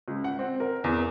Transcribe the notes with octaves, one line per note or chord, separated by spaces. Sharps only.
C#2
F#5
C4
A#4
E2